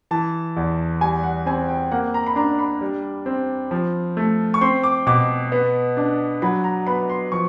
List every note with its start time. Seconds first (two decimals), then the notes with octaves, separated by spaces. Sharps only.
0.11 E3 A5
0.56 E2
1.01 G3 G#5
1.23 F#5
1.46 C4 G#5
1.69 G5
1.91 A#3 F#5
2.14 A#5
2.27 B5
2.36 D4 A#5
2.59 B5
2.81 G3
3.26 C4
3.71 F3
4.17 A3
4.54 C#6
4.61 C4 C6
4.83 D6
5.07 B2 D6
5.52 B3
5.97 D4
6.42 F#3 B5
6.64 A#5
6.87 B3 B5
7.09 C6
7.32 F3 C#6